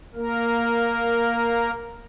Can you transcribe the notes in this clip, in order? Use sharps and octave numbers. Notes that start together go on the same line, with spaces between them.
A#3 A#4